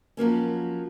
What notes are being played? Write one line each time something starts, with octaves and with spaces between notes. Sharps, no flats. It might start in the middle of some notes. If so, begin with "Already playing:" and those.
F3 F#3 A#3 C#4